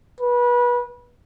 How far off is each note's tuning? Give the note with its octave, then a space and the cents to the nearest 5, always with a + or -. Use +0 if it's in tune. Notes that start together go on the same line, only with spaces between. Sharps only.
B4 -25